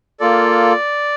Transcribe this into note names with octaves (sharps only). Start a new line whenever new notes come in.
A#3 F4 A4 D5